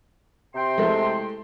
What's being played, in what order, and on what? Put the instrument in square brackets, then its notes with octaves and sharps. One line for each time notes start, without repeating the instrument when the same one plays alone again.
[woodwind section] C3 G5 C6
[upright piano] G#3 A3 E4